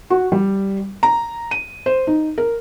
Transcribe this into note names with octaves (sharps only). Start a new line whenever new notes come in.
F#4
G3
A#5
D#7
C5
D#4
A#4